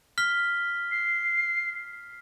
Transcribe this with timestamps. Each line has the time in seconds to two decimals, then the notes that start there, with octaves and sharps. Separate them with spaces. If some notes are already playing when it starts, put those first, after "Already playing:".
0.18 F6 B6 G7
0.91 C7